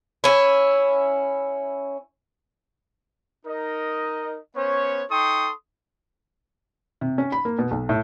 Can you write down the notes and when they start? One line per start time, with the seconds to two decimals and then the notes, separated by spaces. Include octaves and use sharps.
0.24 C#4 E4
3.46 D#4 A#4 D#5
4.55 B3 C#4 C5 C#5
5.10 D#4 A4 G5 C6 C#6 D#6
7.01 C3
7.18 C#4
7.32 B5
7.45 A#3
7.59 B2
7.71 B1
7.89 A2